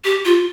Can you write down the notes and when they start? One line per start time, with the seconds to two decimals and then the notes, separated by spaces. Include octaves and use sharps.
0.04 G4
0.25 F4